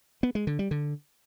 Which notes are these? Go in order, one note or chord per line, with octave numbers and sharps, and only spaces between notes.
B3
G#3
D3
G3
D3